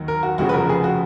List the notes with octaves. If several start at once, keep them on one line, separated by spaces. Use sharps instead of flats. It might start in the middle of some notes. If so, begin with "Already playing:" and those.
Already playing: D#2 D#3 F#3
A#4
F#4
F1 F2 C#3 F#4
B4
A#4
G#4
F#4